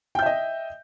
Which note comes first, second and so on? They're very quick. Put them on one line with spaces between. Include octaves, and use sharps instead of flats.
G5 G6 E5 D#5